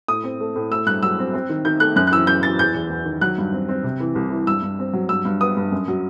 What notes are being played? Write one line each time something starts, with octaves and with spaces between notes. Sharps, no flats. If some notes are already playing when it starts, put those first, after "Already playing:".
A2 D#6
C4
A3
A2
A3 E6
G2 F#6
F#3 E6
C4
C4
D#3
D#3 G6
A3 F#6
F#2 F#6
F#6
E3 E6
F#2 G6
E3 A6
E2 G6
E2
E2
D#3
F#3 F#6
G2
C4
C4
C3
E3
C2
E3
G2 E6
G2
C4
F#3
G2 E6
G2
B3 D#6
G2
F#2
F#3